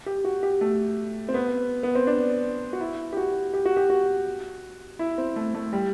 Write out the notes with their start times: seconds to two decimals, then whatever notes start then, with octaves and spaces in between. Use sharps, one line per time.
0.06 G4
0.25 F#4
0.43 G4
0.61 A3
1.28 C4
1.34 B3
1.83 B3
1.95 C4
2.07 D4
2.73 F#4
2.81 E4
3.13 G4
3.17 F#4
3.54 G4
3.65 F#4
3.76 G4
3.90 F#4
4.99 E4
5.18 C4
5.36 A3
5.54 A3
5.73 G3